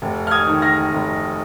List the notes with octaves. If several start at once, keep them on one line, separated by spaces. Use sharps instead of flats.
F1
F6
D#6 G#6
D#3
F6 A#6
F1